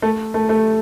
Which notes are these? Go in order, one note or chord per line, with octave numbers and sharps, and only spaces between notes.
A3
A3
A3